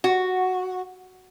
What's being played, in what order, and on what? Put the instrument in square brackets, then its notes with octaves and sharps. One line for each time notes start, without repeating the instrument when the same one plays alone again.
[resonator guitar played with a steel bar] F#4